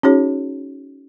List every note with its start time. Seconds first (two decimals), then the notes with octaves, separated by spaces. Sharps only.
0.03 C#4 D#4 F#4 G#4 C#5